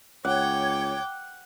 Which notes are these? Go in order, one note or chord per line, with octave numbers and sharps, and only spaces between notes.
C#2 C#5 F#5 G5 D6